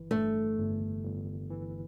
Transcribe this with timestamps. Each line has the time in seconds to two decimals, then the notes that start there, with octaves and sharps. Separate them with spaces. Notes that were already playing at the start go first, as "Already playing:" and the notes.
Already playing: G1 E3
0.11 G2 A3
0.58 G1
1.04 G1
1.50 E3